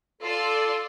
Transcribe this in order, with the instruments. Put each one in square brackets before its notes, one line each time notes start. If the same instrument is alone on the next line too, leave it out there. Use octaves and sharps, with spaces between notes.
[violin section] F4 D5 C6 [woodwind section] A4